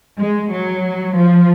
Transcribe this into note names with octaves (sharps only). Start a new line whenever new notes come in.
G#3
F#3
F3